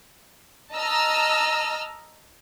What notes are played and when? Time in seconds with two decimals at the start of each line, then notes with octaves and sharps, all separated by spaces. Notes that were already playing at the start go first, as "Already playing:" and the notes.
0.74 D#5 A5 A#5 E6 F6